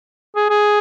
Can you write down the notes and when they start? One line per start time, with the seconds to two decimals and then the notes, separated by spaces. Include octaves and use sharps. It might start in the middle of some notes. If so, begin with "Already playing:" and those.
0.36 G#4
0.50 G#4